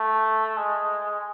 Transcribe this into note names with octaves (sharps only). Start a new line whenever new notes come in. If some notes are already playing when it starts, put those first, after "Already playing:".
Already playing: A3
G#3